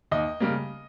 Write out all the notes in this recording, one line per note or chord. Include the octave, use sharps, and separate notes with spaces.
D#2 D#5
C#3 G3 A#3